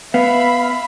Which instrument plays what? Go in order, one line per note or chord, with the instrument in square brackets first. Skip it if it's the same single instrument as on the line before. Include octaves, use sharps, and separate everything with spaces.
[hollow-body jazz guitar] B3 [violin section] E5 B5 B6 [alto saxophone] F5